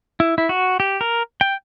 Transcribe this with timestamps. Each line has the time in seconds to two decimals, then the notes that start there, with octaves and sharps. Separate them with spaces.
0.20 E4
0.38 E4
0.49 F#4
0.80 G4
1.01 A#4
1.41 G5